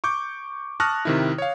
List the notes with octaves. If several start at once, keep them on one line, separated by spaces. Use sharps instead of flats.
C#6 D6 G6
A5 C#6 D#6 F6 F#6 A#6
C3 D#3 E4
C#5 F5